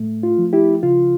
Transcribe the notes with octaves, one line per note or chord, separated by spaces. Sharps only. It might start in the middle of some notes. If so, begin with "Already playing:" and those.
Already playing: A2 A3
F4
F3
E4 G4
C#3 F4